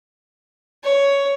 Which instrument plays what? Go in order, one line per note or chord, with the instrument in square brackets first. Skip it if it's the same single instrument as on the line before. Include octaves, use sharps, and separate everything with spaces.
[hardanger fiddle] C#5